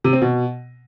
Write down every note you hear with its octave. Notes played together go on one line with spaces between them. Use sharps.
C3
C4
B2